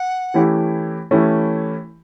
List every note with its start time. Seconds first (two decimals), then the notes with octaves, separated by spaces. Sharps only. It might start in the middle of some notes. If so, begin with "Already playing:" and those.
Already playing: F#5
0.34 E3 A3 C#4 E4 G4
1.11 E3 A3 C#4 E4 G4